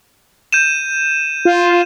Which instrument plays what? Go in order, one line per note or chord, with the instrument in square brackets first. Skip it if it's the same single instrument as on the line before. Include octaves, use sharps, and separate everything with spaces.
[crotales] G6 D#7 E7
[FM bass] F4